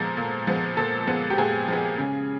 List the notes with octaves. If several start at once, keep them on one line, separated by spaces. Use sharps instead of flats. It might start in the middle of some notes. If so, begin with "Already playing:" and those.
Already playing: A#2 F3 G#3 B3 A4 A#4
A#2
F3 G#3 B3
A#2 A4
F3 G#3 B3
G4
A#2 G#4
F3 G#3 B3
C#3